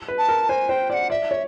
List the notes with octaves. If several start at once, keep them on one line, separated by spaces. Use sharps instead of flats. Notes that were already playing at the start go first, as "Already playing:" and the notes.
B4
A5
A#4
C5 G#5
C5 G5
D5 F#5 G5
D5 E5
C#5